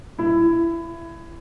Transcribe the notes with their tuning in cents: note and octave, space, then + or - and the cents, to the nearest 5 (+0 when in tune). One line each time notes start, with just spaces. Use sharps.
E4 +20